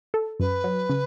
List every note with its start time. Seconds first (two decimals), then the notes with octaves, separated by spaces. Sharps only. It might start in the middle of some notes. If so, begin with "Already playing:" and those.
0.14 A4
0.40 F#2 B4
0.64 F#3
0.89 C#3